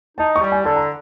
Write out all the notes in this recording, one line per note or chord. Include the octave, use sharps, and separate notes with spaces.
D#4 A5
C#6
G3
G#5
D3 A5
A#5